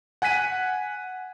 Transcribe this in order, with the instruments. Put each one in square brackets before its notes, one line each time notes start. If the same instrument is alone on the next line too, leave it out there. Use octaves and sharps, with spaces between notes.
[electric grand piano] F#5 G#5 F#6 B6 D#7